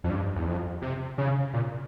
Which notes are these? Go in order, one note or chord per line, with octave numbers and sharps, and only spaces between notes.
F2
G2
E2
F2
C3
C#3
A#2